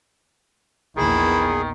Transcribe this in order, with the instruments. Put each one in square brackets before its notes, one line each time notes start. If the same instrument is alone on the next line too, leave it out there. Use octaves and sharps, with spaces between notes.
[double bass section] A#1 E2 B3 [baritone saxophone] D#3 [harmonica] E4 [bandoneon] G#4